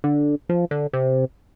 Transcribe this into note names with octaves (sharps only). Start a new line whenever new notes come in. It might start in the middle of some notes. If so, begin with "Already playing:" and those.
D3
F3
D3
C3